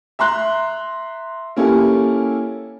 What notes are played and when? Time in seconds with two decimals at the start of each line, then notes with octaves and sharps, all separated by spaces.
0.19 E5 A#5 C6 F#6
1.56 A#3 C#4 E4 G4 A4